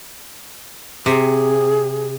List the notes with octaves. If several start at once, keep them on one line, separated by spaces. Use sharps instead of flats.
C3 G#4